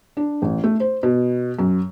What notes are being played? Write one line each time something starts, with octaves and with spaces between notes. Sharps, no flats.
D4
A1
A3
C5
B2
F#2